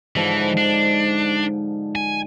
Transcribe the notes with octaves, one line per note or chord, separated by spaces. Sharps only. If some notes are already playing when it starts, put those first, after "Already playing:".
G#2 D3 E3 F3
D4
G#5